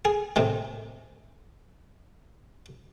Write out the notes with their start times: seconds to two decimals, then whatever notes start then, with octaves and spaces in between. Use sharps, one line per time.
0.05 G#4
0.36 A2 C3 D#3